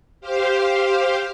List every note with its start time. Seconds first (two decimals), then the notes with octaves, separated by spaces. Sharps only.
0.21 G4 C5 F5